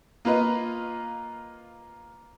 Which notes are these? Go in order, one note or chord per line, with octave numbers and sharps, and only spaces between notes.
A#3 F4 B4 D#5